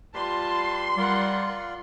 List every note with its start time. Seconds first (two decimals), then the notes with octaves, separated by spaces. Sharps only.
0.15 G3 F4 G4 B4 A5 C6
0.97 G3 F4 A#4 D5 F#5